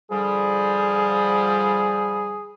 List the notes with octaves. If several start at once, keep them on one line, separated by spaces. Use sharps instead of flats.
D3 F3 G3 G#4